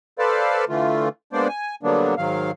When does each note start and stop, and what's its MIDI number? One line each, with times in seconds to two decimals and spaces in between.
0.19 0.65 69
0.19 0.65 71
0.19 0.65 72
0.19 0.65 74
0.19 0.65 77
0.19 0.65 81
0.69 1.09 50
0.69 1.09 52
0.69 1.09 57
0.69 1.09 65
1.33 1.48 56
1.33 1.48 58
1.33 1.48 59
1.33 1.48 62
1.33 1.48 72
1.33 1.48 74
1.49 1.75 80
1.83 2.15 50
1.83 2.15 54
1.83 2.15 55
1.83 2.15 58
1.83 2.15 59
1.83 2.15 62
2.17 2.51 44
2.17 2.51 51
2.17 2.51 54
2.17 2.51 77